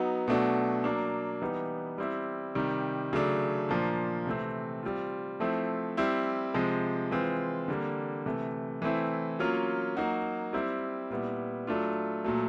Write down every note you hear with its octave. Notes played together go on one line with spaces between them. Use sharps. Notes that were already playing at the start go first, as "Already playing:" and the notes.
Already playing: F#3 B3 D#4 F#4
B2 F#3 A3 D4 F#4
F#3 A#3 D4
E3 G3 B3 D#4
G3 C4 E4
C3 D#3 G3
C#3 F#3 A3 D4
A#2 F3 A#3 D4
C3 E3 A3 C4
G3 C4 F4
F3 A3 C4 E4
G3 C4 E4
C3 F3 G#3
E3 G#3 C4 F4
D3 G3 A#3
C3 E3 A3
E3 A3 C4 E4
F#3 A#3 C#4 F4
F#3 A#3 D#4 F#4
G3 C4 E4
A#2 G3 B3 E4
F#3 A3 D4 F4
A#2 F#3 A3